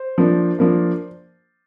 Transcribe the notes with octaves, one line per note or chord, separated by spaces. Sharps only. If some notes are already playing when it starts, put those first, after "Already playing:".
Already playing: C5
F3 A#3 D4
F3 A#3 D4